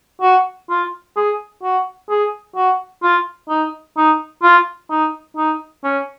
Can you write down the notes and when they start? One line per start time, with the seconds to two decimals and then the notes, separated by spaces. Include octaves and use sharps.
0.22 F#4
0.70 F4
1.16 G#4
1.63 F#4
2.10 G#4
2.56 F#4
3.02 F4
3.49 D#4
3.97 D#4
4.43 F4
4.91 D#4
5.37 D#4
5.84 C#4